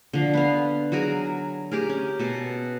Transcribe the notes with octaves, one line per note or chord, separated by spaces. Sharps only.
D3 F3
B3 B4 F5
F#3 F#4 G#4 A#4
G4 G#4 A#4
C#4
B2 A4